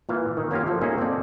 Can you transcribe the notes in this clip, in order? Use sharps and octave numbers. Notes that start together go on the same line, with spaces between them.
A#2 E3 F5
D#3
A#3 C#4 F4 G4 F5
F3 F#3 F4 A4 C5
A#3 C#4 D#4 G#4 E5
A#3 C4 F4 A4 D5